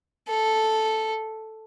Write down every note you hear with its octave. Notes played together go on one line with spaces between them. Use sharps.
A4